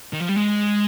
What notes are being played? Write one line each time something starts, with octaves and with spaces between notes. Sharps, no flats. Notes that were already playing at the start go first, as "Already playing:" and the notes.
D#3
F3
G3
G#3